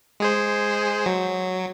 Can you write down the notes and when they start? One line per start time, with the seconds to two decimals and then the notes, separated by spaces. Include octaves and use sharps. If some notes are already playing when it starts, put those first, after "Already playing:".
0.20 G#3 G#4 C5
1.06 F#3